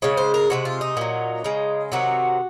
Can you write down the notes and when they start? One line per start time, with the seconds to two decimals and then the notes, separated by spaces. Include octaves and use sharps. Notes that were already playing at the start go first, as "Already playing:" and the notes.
0.02 C#3 G#3 C#5
0.17 C5
0.34 A#4
0.50 C3 F3 G#3 F#4
0.65 F4
0.81 D#4
0.97 A#2 F#3
1.44 C#3 G#3
1.92 C3 D#3 F#3 F#4